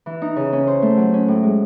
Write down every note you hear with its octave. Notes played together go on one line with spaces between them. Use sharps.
E3
D#4
C#3
C#4
C5
A3
F#3
C#4
A2
G#3